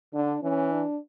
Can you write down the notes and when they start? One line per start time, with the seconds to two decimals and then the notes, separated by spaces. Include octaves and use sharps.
0.14 D3 D4
0.43 E3 C#4
0.72 D4